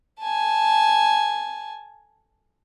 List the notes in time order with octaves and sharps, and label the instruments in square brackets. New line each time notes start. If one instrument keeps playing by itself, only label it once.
[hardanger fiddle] G#5 A5